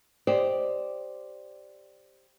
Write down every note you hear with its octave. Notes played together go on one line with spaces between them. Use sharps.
G4 C5 D5 D#5